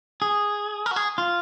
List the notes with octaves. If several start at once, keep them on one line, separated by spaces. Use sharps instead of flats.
G#4
A#4
F#4
G#4
F4